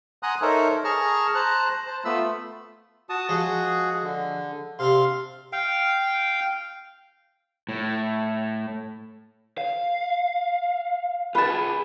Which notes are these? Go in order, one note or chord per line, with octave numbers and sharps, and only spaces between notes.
F#5 G#5 A#5 C6 D#6 F#6
D#4 A4 A#4 C5 C#5 E5
G#4 A5 A#5 C#6 F6
C5 A5 A#5 F#6
C5 A5
A3 B3 F4 B5 E6
F#4 A5 D#6
F3 G#3 F#4 G#4 C#5
D3
C3 D4 F5 C6
F5 G5
A2
F5
F4 G#4 B4 A5